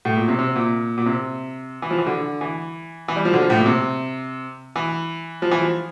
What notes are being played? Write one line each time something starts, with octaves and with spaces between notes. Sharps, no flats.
A2
A#2
C3
C3
A#2
A#2
C3
E3
F3
E3
D3
E3
E3
G3
F3
D3
F3
A2
A#2
C3
E3
F3
E3
F3